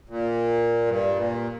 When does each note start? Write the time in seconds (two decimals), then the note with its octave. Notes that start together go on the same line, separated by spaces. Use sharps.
0.09 A#2
0.86 G2
1.16 A#2